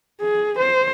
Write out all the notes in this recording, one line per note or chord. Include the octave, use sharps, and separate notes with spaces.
G#4
C5